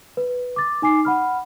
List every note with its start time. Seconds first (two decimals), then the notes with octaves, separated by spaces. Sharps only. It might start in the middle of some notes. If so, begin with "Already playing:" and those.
0.17 B4
0.56 D6 A6
0.82 D#4 G#5 D6 C7
1.05 F#5 B5 F6